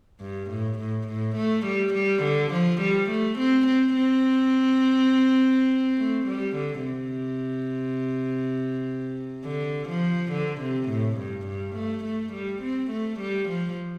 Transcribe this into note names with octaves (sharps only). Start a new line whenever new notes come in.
G2
A2
A2
A2
A3
G3
G3
D3
F3
G3
A3
C4
C4
C4
A3
G3
D3
C3
D3
F3
D3
C3
A2
G2
G2
A3
A3
G3
C4
A3
G3
F3